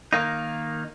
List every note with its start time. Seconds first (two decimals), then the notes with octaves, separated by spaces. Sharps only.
0.13 D#3 A#3 D#4